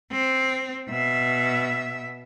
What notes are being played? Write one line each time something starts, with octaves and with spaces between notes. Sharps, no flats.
C4
B2 E5